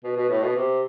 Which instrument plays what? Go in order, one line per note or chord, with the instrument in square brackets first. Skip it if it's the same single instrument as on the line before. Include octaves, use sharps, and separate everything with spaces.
[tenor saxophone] B2
B2
A2
B2
C3